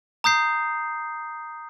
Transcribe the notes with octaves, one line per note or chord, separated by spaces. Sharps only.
A#5 D#6 G6 C7